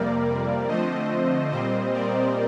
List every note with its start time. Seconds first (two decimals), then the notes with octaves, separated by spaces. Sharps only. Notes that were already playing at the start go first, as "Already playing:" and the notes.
Already playing: F2 C3 G3 A#3 A#4 D5
0.68 D3 F3 A3 C4 C5 D#5
1.51 A#2 G3 C4 C5 D#5
1.93 A#4 D5